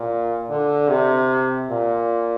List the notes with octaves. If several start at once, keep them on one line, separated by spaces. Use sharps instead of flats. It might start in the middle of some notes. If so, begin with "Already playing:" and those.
Already playing: A#2
D3
C3
A#2